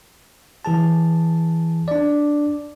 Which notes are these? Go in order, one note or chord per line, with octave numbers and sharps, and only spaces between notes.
E3 G#4 A5
D4 D5